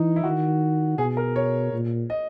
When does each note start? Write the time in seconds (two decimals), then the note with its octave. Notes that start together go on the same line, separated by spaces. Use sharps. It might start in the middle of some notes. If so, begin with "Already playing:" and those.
Already playing: E3 D#4
0.16 E4
0.24 D#3 F#4
0.98 B2 G#4
1.17 A#4
1.36 C#5
1.73 A#2
2.10 D#5